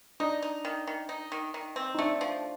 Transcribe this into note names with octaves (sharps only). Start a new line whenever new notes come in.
D4 D#4
D#4
D#3
D#3
D#4
D#3
D#3
C4
D#4
A3 D4
F3